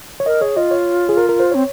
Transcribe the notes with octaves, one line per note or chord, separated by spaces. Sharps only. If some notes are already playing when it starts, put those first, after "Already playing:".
C#5
A#4 D#5
G#4 C#5
F4 D#5
C#5
G#4
A#4
A#4
C5
C4 C#5